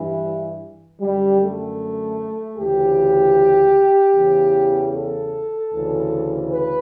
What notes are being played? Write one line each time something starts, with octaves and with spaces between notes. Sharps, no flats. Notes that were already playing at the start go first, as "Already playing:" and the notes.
Already playing: G2 E3
F#2 D3 G3
A3
D2 C#3 E3 G4
E2 C#3 E3
A4
D2 C#3 E3
B4